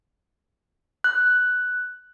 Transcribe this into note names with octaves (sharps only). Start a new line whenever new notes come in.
F#6